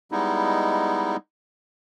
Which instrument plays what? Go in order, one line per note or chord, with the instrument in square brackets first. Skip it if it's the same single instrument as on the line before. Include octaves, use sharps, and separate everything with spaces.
[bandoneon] G3 G#3 B3 D#4 E4